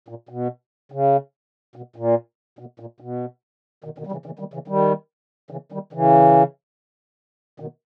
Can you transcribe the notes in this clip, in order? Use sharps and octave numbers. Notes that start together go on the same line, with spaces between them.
A#2
B2
C#3
B2
A#2
B2
A#2
B2
B2 D#3
B2 D#3
G3
C#3 E3
C#3 E3
D#3 G3
C#3 E3
D#3 G3
C#3 E3
D#3 G3
C#3 E3
B2 D#3